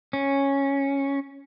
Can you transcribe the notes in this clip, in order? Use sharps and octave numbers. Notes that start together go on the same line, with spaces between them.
C#4